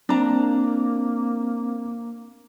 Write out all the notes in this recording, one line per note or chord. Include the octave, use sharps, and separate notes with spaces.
A#3 C4 D4 A#5